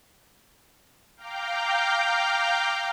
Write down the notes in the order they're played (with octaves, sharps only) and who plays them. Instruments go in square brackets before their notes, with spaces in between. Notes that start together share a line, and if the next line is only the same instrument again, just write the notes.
[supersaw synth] F5 G5 A#5 D6 F6 G6